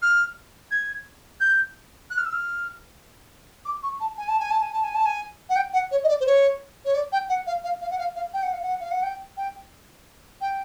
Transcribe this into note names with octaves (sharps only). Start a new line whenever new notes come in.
F6
G#6
G6
F#6
F6
E6
F6
D6
C#6
A5
G#5
A5
G#5
A5
G#5
A5
G#5
A5
G#5
F#5
G5
F#5
C#5
D#5
D5
C5
C#5
C#5
D5
G5
F#5
F5
F5
F5
F#5
F5
F5
G5
F#5
F5
F#5
F5
F#5
G5
G5
G5